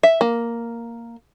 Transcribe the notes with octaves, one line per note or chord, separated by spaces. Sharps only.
E5
A#3